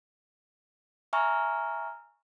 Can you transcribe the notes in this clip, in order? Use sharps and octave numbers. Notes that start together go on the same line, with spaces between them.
E5 G#5 A#5 C#6 F6